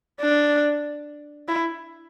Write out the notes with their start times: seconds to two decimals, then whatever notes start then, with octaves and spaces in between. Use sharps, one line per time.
0.21 D4
1.48 E4